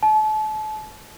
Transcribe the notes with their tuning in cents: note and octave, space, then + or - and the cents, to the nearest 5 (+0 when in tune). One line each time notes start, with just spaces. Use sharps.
A5 -35